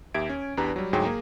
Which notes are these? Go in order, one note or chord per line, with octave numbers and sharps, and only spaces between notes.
D#2 G4 E5 G#6 D7
C#4
E2 D4 G4 B4 A#5
F#3 G3
D2 G#2 F#3 G#4 G5
A#3 G#4 A#5